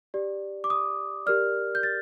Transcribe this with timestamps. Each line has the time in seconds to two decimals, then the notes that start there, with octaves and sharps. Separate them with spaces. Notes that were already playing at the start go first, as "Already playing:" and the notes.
0.14 G4 D5
0.64 D6
0.70 D#6
1.26 G4 A#4 D5 F6
1.75 G6
1.83 A6